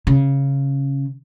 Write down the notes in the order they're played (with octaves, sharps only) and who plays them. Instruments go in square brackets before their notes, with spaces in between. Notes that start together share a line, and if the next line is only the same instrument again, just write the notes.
[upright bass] C#3